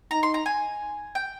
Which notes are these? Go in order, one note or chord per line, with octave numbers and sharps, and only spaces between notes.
D#4 A#5
C6
A#5
G#5
G5